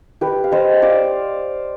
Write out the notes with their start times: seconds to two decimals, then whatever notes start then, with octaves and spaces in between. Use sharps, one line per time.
0.21 G4 B4
0.44 F5
0.52 C5 D#5
0.82 D5 F5